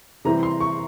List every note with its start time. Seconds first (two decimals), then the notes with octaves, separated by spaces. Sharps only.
0.25 C3 E3 G3 C4 E4 A#5
0.43 C6
0.60 C#6